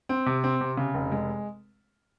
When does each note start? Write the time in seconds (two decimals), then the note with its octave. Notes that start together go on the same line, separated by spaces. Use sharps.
0.09 C4
0.26 C3
0.44 C4
0.61 C3
0.77 C#3
0.94 F1
1.12 G#3